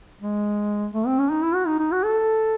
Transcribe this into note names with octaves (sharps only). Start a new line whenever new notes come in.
G#3
A3
C4
C#4
D#4
E4
F#4
D#4
D#4
F#4
A4